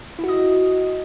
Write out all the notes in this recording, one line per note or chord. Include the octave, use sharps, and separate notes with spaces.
E4 F#4 D#5